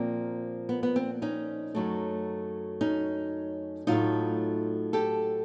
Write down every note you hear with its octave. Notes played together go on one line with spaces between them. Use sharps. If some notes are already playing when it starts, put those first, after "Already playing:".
Already playing: A#2 F3 A#3 C4
B3
B3
C4
C#4 D#4
F#2 C#3 F#3 A3
C#4 D#4
A2 F#3 A3 D#4 F4
G4 A4